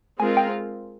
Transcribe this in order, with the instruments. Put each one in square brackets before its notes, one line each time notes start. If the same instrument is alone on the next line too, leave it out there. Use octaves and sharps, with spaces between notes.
[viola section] G#3 C4 F4 A#4 [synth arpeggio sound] G#5
[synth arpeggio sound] G5